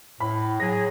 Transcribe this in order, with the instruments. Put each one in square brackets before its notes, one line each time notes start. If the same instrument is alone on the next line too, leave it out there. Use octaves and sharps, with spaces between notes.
[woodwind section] A2 [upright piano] B5
[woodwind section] F#3 G#4 [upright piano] A#6